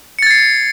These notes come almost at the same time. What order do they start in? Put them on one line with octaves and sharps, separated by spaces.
C#7 A6 G#6 C7